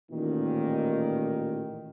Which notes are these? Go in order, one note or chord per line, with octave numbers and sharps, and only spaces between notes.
A1 A#2 D#3